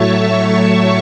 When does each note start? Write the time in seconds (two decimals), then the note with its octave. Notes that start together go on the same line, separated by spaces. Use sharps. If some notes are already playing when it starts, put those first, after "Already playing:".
Already playing: A2 F#3 A3 C#5 E5 A5 C#6
0.15 A5 C#6